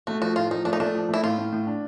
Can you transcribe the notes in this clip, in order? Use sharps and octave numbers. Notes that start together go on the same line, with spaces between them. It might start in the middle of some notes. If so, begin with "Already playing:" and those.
A3 F#4
F3 F#4
A2 F4
F3 D#4
A3 D4
D#4
A3 D4
F3
A3 E4
A2 F4
A2
A2
D4